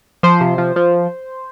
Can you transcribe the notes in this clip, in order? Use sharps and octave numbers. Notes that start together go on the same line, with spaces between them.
F3 C5
C3
F3
F3